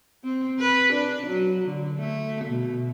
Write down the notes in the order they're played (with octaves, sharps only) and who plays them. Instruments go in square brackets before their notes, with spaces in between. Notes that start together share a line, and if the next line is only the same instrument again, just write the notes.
[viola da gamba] C4
B4
D4
F#3
D3
A3
B2